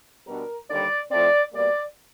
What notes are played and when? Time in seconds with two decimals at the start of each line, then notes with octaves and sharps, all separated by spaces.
0.27 B2 G3 B3 D4 A#4
0.68 D#2 D3 G3 D5
1.10 A2 F3 A3 C4 D5
1.52 B2 G3 A#3 D5